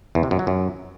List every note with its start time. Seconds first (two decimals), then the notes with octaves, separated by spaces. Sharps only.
0.15 E2
0.23 C3
0.31 F#2
0.39 F#3
0.47 F#2